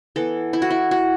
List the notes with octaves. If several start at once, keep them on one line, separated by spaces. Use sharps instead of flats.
E3 B3 A4
E4
F#4
E4
F#4